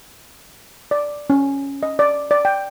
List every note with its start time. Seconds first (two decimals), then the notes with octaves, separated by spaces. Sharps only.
0.91 D5
1.30 C#4
1.83 D#5
1.99 D5
2.31 D5
2.45 G5